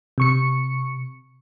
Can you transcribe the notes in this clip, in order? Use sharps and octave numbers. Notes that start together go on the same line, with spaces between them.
C3 C#6 C#7